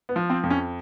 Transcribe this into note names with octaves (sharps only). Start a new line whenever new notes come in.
B3
F3
C4
F2
C#4